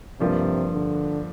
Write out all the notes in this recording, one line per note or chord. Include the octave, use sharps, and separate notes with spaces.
G2 C3 F3 A#3
D3